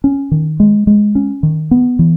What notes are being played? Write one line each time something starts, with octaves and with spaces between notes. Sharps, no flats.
C#4
D#3
G#3
G#3
C#4
D#3
B3
E3